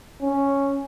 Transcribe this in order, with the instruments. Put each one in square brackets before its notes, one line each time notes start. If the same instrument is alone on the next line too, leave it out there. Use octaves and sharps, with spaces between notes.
[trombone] C#4